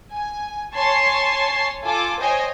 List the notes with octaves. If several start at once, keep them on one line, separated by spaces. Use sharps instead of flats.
G#5
C#5 G#5 A5 C6 C#6 C7
F4 A4 G#5 D6
C5 C#5 D#5 G5 G#5